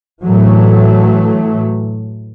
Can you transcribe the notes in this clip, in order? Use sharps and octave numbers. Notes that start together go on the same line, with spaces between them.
A2 E3 F#3 A3